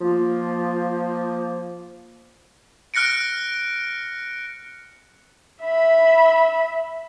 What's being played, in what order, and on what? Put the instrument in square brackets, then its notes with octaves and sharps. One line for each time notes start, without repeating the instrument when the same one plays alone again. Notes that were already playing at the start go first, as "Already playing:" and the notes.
[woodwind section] F3 A#3 F4
[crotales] F6 F#6 A#6 C#7 D7
[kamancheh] E5 B5